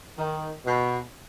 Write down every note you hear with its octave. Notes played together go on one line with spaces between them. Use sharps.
D#3
B2